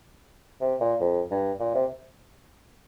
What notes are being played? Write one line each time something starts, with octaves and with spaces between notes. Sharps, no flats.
C3
A#2
F2
G2
A#2
C3